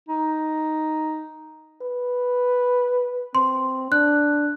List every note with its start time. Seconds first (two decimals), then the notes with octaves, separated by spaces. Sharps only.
0.09 D#4
1.82 B4
3.35 C4 C6
3.92 D4 F#6